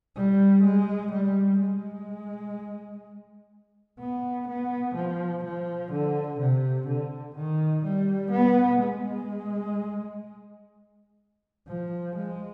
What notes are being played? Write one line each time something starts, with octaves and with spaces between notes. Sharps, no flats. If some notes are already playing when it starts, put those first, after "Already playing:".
G3
G#3
G3
G#3
B3
B3
F3
F3
D3
C3
D3
D#3
G3
B3
G#3
F3
G#3